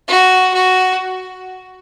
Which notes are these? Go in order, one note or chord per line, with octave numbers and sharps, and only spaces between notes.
F#4
F#4